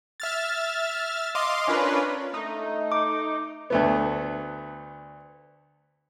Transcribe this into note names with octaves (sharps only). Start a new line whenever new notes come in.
E5 F6 A6
D#5 F5 C6 D6
C#4 D4 F4 A#4 B4
A3 D#4
D6
D2 A3 B3